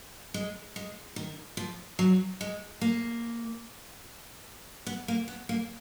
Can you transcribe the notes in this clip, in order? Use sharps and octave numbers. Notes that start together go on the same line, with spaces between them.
G#3
G#3
D#3
F3
F#3
G#3
A#3
B3
A#3
B3
A#3